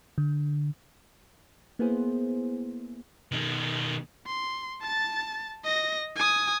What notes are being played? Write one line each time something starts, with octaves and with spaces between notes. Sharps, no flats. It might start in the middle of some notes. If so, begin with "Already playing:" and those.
D3
A#3 B3 E4 G#4 C5
B2 D#3
C6
A5 A6
D#5 A#6
G#5 D#6